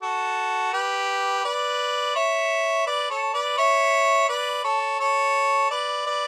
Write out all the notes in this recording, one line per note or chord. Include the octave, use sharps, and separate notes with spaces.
F#4 A4
G4 B4
B4 D5
C#5 E5
B4 D5
A4 C#5
B4 D5
C#5 E5
B4 D5
A4 C#5
A4 C#5
B4 D5
B4 D5